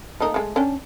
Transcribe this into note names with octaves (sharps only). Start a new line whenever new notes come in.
A3 A#3 D#4
G#3 A3
C#4 D4 G5